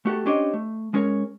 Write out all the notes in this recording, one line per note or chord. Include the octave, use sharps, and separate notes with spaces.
A3 F#4 G4 A4
C#4 D4 G4 C5 C#5 D#5
A3
G#3 C#4 A#4 C#5